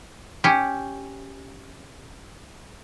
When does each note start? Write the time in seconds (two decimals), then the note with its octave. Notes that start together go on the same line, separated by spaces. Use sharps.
0.44 C#4 G4